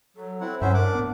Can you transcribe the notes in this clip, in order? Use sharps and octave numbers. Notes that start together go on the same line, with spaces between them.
F#3 A4
C4 E4 F#5
G2 F#3 C#4 C5 E5 F#5
D4 A#4 F#5 D6
A2 B3